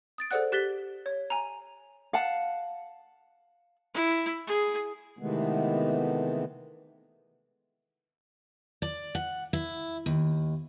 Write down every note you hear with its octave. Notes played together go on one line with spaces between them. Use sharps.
D#6 A6 D7
G#4 A4 C5 D5 F#5 F#6
G4 F#6 A6 B6 G7
C#5
G#5 A#5
F5 F#5 A5
E4
G#4
C3 D#3 E3 G#3 A3 B3
D5
F#5
E4
D#2